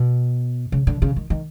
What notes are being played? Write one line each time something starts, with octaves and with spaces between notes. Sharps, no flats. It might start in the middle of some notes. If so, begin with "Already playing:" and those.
Already playing: B2
C#3
D3
C#3
D#3
D#3